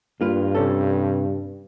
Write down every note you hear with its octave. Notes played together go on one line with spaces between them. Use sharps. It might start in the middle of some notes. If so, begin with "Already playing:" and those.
G2 A#3 F4 B4
C3 C#4 A4